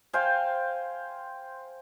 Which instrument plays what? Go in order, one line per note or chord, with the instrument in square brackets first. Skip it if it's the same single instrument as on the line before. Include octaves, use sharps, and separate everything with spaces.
[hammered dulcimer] C5 F5 G5 G#5